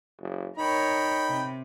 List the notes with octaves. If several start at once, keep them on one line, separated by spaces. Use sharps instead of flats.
F#1
D#4 A#4 C#5 G5 B5
C3